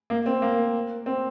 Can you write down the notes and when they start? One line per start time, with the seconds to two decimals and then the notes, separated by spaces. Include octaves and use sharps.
0.10 A#3
0.26 C4
0.42 A#3
1.06 C4